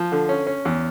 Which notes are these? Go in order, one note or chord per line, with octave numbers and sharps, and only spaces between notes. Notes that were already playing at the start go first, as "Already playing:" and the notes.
Already playing: F3
D3
C#4
C#4
E2